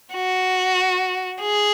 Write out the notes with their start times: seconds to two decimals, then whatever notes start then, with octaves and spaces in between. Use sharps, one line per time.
0.14 F#4
1.41 G#4